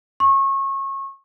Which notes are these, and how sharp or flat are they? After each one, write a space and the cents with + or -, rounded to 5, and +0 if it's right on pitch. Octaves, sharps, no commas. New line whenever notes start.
C#6 -30